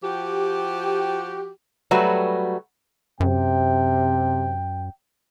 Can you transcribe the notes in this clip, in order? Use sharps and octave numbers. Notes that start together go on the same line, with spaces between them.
F3 F#4 G4
F#3 G3 A3 F#4 B4
F#2 C3 G5